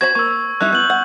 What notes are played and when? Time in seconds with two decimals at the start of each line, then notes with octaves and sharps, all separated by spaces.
0.01 F#4 C5 B5 G#6
0.15 A#3 C#6 E6
0.61 G3 D#4 E4 F#6
0.73 B3 G6 F#7
0.90 F#5